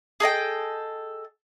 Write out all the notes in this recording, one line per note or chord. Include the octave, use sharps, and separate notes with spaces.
G#4 A4 D#5 G5